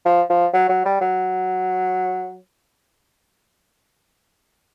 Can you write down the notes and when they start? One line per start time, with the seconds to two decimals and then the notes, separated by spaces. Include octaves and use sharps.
0.05 F3
0.30 F3
0.53 F#3
0.69 F#3
0.85 G3
1.01 F#3